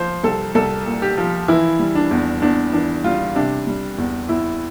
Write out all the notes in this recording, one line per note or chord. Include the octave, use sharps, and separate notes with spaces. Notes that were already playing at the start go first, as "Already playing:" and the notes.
Already playing: F3 C5
C2 A4
C2 A4
A#2
G4
F3
E3 E4
G3
D4
E2
E2 D4
E3 D4
G3 F4
C3 D4
G3
E2
E2 E4